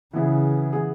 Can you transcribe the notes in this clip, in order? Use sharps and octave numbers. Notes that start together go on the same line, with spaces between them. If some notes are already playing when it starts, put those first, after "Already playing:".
C#3 E3 B3 E4 G#4
E3 B3 E4 G#4